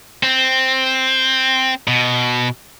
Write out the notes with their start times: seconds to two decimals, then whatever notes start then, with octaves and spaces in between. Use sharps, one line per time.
0.23 C4
1.88 B2